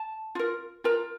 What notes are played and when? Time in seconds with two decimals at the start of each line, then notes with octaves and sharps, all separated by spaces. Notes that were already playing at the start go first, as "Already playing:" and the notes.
Already playing: A5
0.35 F4 A#4
0.84 F4 A#4 A#5